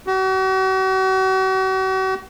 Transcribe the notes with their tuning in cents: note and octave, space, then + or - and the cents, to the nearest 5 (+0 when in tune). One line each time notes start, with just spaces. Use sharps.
F#4 +40